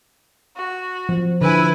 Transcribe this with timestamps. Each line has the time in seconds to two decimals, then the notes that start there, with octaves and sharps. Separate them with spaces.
0.56 F#4
1.09 F3
1.41 D3 E4 B4 G#5